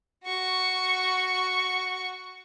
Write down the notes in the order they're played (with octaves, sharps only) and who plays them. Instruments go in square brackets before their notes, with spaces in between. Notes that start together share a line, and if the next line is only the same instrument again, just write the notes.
[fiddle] F#4 C#6